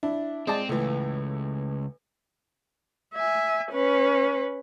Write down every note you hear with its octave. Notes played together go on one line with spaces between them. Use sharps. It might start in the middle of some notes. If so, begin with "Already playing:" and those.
D4 E4
G#3 C4 D5 A5
C#2 A2 E3
E5 G#5
C#4 B4